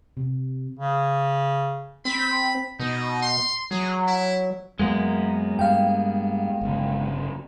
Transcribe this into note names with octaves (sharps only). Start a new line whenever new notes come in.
C3
C#3
C4 B5
B2 D#4
C6
F#3 G#4
E4
F#2 G#3 A#3 B3
G2 F5 G5
G1 C#3